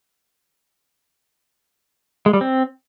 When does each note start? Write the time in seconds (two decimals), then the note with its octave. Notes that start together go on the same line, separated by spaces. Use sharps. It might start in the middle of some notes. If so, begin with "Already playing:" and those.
2.26 G#3
2.33 G3
2.41 C4